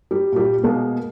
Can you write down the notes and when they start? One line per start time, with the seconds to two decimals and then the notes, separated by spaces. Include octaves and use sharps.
0.11 G3
0.32 A#2 G3
0.63 B2 G#3 A#3